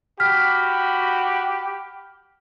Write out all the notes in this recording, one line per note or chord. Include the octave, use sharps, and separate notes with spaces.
F#4 G4 B5 F6 B6